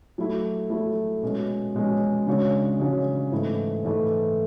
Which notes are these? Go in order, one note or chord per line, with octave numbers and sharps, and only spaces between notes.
F#3 A3 E4
F#3 A3 E4
B2 G#3 C#4
B2 G#3 C#4
C#3 G#3 D4 F#4 C#5
C#3 G#3 D4 F#4 C#5
G#2 E3 A3 E4
G#2 E3 A3 E4